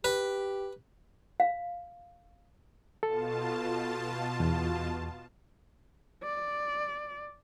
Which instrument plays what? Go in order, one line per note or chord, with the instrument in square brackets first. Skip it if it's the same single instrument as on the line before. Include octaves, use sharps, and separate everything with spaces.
[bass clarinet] G4 [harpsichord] B4
[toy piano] F5
[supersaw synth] B2 F4 A5 [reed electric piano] A4
[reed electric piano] E2
[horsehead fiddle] D5